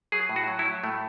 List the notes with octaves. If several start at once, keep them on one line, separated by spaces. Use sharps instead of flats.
F#3 G#4
A2
F#4
F#3
E4
F#3
A2 A3